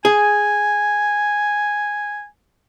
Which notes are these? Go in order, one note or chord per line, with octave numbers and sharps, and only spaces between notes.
G#4 G#5